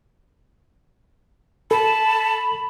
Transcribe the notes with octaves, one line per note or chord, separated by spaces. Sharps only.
A4 A5 B5